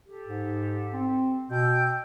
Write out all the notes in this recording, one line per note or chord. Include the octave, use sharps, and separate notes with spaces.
G4 A4
G#2
C4
B2 G5 E6 G6